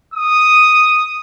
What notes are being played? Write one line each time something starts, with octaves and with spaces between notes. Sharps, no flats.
D#6